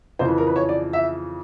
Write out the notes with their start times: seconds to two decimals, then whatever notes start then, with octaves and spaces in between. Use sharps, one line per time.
0.19 F2 C#3 E3 C5
0.28 B4
0.38 A#4
0.47 B4
0.56 C#5
0.69 D5
0.93 E5